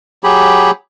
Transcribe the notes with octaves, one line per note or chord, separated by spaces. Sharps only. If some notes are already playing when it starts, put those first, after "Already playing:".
F#3 G4 G#4 B5